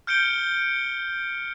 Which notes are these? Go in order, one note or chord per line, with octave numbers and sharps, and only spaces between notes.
F6 G6 C#7 D7 G7